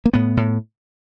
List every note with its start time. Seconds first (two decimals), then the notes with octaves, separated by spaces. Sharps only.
0.06 A#3
0.13 A2 B3
0.37 A2